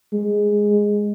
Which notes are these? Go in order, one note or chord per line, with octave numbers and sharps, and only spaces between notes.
G#3